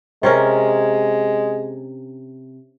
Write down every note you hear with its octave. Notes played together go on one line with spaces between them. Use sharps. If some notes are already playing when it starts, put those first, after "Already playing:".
C3 G#3 C#4 A#4